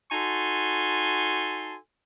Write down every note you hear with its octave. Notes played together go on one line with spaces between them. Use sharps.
D#4 F#4 A4 G#5 A5 C6